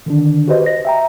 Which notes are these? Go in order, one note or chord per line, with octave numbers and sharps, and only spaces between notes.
D3 D#3 D4
F#4 G4 B4 C5 D#5
D#5 A#6
E5 G5 A#5